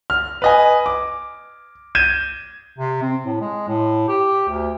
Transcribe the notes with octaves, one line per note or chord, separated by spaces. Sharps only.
F6
B4 D#5 G#5
D6
G6 G#6 D#7 E7
C3
C4
A2
G#3
A2
G4
D2